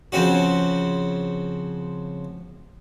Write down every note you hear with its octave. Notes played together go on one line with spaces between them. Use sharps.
C#3 F3 C4 C#4 F#4